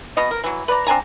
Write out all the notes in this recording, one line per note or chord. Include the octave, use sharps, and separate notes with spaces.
B2 B3 D#5
A#4
E3 F#3
B4 D5 A#5
C4 D4 G#5 A#5